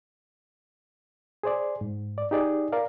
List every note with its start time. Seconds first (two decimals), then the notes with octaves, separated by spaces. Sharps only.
1.43 G#4 C5 D5
1.81 G#2
2.18 D5
2.31 D#4 G4 G#4 D5 D#5
2.72 A#4 D5 F5